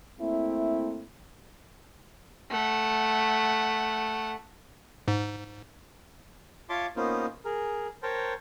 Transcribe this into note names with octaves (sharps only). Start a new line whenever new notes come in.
A3 A#3 C4 E4
A3 F#5
G#2
F4 C#5 E5 A5 C6 D6
A#3 B3 C#4 D#4 F4 C5
G#4 A#4
A#4 C5 C#5 G5 A5 A#5